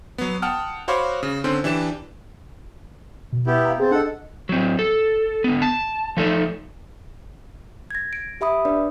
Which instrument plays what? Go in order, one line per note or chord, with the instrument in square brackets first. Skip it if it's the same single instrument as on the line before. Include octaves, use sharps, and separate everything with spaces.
[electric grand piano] F#3 B3
F#5 G5 A5 D#6 F6
F#4 C5 C#5 F5 B5 D6
C#3
D3 C4 C#4 C5
E3 D4 G4 E7
[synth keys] B2
[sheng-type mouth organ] B3 E4 G4
[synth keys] F5 A#5
[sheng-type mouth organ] C4 [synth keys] G#4 A6
[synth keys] D4 D#5 [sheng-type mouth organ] A4 F#5
[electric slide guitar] F#3 C4
A4
D3 B3
A5
F3 A3 D#4 A4
[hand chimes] G#6 A#6
D7
G4 E5 B5 D#6
D4 B4 D5